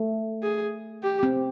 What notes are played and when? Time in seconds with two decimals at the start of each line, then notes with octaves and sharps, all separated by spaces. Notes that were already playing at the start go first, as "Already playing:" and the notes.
Already playing: A3
0.43 G#4
1.03 G4
1.23 C4